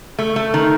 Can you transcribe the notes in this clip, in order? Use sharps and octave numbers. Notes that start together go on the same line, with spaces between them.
A3
A3
D#3